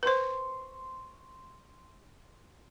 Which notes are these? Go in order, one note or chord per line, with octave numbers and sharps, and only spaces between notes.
B4 C5 C6 C#6